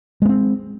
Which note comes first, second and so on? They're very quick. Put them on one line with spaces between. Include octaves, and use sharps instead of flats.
G#3 B3 C4